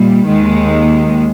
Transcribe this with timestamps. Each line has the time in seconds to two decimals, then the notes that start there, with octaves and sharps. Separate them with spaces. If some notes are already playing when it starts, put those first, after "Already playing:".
Already playing: A#2 G3
0.25 D#2 D#3 G#3